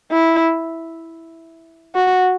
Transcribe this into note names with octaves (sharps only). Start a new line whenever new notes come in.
E4
F#4